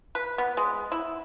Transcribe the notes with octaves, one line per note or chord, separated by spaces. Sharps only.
B4
B3
G#3
E4